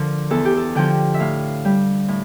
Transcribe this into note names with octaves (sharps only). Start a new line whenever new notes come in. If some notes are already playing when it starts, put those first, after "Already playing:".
Already playing: D3 F3 A#4
E2 A4
G4
A4
D3 F3 G5
E5
A2 F5
G3
A2